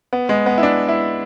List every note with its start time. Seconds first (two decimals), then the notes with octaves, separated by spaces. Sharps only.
0.13 B3
0.29 G#3
0.46 B3
0.58 E4
0.63 D4
0.89 E4